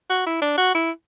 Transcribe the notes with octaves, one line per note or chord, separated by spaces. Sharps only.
F#4
E4
D4
F#4
E4